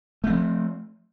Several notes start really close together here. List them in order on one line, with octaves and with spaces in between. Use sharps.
A3 C4 F3